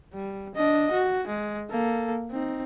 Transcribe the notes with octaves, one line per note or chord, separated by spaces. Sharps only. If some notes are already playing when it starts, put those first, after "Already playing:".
G3
D4 D#5
F#4
G#3
A#3 A4
C4 D#4